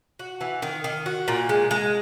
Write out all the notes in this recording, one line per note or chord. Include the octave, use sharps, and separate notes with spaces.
F#4
E3
D#3
D#3
F#4
A#2
G#3
G#3